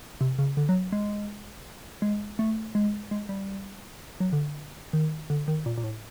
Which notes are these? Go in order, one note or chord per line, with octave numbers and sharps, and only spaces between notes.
C3
C#3
D3
F#3
G#3
G#3
A3
G#3
G#3
G3
F#3
D3
D#3
D3
D#3
A#2
A#2
A2